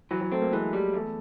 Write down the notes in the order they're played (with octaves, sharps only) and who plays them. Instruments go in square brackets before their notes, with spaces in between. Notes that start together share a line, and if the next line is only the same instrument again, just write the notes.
[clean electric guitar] E3 [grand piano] F#3
[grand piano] F#3
[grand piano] A3 [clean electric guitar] C4
[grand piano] A#3
[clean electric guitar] E3 [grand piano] G#3
[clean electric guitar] G3
[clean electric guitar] E2 [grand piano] A3